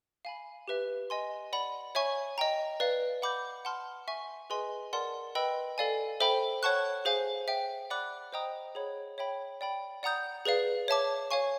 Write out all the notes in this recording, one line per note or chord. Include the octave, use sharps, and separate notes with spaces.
F5 G#5 B5
G4 B4 E5
D#5 G#5 C6
D5 F#5 B5
C#5 E5 G#5 C#6
D#5 G5 A#5
B4 D5 F5
F#5 B5 D6 G6
F#5 A5 C6 F6
E5 G#5 C#6
G#4 B4 D#5 G#5 C6
A#4 D5 F#5 A5 C6
B4 D#5 G5 B5 E6
A4 D5 F5 G#5
A4 C5 E5 G5 B5
C#5 F#5 A5 C#6 F#6
G#4 C5 F5 G#5
C5 E5 G5
D5 F#5 B5 D6 F#6
C5 D#5 G5 A#5 D#6
G#4 C#5 F#5 B5
C#5 E5 G5 B5
D5 G5 B5
D5 F#5 A#5 D#6 G6
G#4 B4 D5 F5
C#5 E5 A5 D6
C#5 F5 G#5 C#6